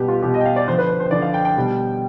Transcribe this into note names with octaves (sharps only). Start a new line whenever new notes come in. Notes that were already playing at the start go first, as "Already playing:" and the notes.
Already playing: B2 G3 G4 B4
F4
B2 G3 G4
D#5
G5
F5
D5
D3 F3 C5
B4
C5
C5
D3 F3 D5
F5
G5
G5
B2 G3